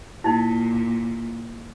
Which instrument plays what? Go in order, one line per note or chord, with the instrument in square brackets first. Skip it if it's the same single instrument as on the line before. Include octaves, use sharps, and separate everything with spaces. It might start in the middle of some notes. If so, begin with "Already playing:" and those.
[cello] A#2 [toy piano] D#4 E4